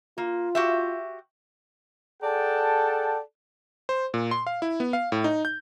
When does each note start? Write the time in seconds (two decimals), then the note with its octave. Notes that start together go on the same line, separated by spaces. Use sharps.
0.18 A#3 F4
0.55 F#4 G4 E5
2.22 G#4 A4 D5 F#5 G5 A5
3.89 C5
4.14 A#2
4.31 C6
4.47 F5
4.62 E4
4.80 B3
4.93 F5
5.12 A2
5.24 D#4
5.45 G6